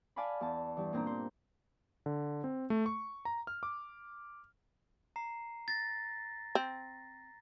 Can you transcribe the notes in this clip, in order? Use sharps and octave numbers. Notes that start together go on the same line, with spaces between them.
D5 F5 G#5 A5 B5
E2 A5
G2 E3
A#2 C4 D4 A#5
C5
D3
C4
A3
C#6
A#5
F6
D6
A#5 C7
A6 A#6
C4